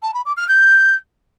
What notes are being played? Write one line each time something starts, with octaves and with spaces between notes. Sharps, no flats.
A5
B5
D6
F6
G6